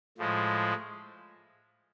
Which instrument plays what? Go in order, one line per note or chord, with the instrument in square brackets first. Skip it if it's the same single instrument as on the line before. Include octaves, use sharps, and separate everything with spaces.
[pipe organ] A2 F3 G#3